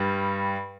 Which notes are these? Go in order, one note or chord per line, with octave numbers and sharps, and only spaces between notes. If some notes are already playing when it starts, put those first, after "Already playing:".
Already playing: G2 G3